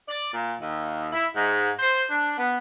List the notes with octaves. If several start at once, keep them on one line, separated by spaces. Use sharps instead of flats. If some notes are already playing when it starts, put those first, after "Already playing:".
D5
A#2
D#2
E4
G#2
C5
D4
B3